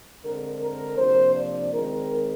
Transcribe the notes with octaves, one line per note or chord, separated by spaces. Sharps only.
D3 G#3 C4 A#4
A#4
C3 F3 A#3 D4 C5
D5
D#3 G#3 C4 A#4